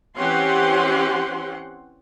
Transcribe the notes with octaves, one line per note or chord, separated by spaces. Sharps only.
E3 C4 C#4 G4 F#5 C6